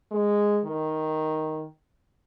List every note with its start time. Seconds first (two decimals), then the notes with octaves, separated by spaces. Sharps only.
0.11 G#3
0.65 D#3